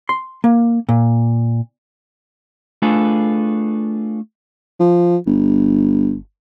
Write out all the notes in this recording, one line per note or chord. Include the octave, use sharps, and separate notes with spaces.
C6
A#3
A#2
A3 D4 F4 G#4 A4 B4
F3
G1